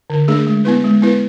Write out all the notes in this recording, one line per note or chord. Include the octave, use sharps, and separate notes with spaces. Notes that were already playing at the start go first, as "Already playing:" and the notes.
D3
A3 D4 G#4
G#3
B3 E4 B4
G#3
B3 E4 B4